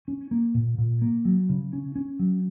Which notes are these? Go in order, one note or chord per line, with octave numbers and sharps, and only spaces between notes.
C#4
A#3
A#2
A#2
A#3
F#3
C#3
C#4
C#4
F#3